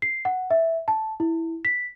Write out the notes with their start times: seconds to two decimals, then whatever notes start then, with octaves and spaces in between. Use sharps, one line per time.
0.02 C7
0.25 F#5
0.51 E5
0.88 A5
1.20 E4
1.65 B6